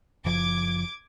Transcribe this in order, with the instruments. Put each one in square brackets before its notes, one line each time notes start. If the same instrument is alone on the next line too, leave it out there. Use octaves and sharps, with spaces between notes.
[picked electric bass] F#1 F3 [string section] D6 G#6